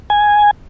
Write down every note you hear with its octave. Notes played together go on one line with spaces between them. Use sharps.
G#5